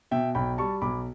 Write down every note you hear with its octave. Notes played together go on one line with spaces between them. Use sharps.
B2 E5 G5
B1 G5 B5
G3 A5 C#6
B1 B5 D6